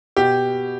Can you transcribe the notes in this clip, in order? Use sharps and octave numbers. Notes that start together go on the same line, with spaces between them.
B2 G4